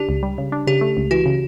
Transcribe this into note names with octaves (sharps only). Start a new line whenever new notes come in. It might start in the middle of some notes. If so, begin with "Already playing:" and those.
Already playing: C#3 D4 G4
C#2
G3
C#3
D4
C#3 G4
A3
C#2
E3 F#4
C#3